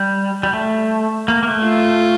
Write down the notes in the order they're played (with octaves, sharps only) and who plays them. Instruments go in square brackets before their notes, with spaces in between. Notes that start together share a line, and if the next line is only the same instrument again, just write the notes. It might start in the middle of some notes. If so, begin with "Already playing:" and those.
Already playing: [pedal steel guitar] G3
G3
A3
A#3
A#3
A3
[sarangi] F4